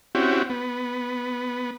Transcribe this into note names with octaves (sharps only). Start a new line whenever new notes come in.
C4 C#4 E4 F#4 G4
B3